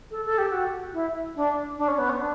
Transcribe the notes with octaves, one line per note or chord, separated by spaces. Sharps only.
A4
A4
G4
F#4
E4
D4
D4
C#4
B3
C#4
D4